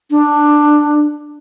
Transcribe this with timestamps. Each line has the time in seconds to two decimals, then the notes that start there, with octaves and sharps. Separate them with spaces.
0.11 D4